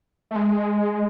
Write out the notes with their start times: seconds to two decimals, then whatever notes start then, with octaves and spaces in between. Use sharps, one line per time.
0.31 A3
0.36 G#3